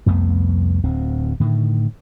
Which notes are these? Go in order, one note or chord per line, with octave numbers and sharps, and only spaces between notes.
C2 F2 A3 B3
D1 D2 C4
A2 D3 D#3